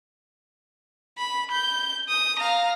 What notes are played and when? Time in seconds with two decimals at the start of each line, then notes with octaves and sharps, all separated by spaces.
1.18 B5
1.51 G6
2.09 D#6
2.39 F5 A#5